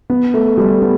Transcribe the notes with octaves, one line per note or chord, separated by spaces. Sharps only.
B3
A3
G3
B3